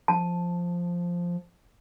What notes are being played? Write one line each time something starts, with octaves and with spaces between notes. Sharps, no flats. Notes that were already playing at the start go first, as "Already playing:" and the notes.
F3 A5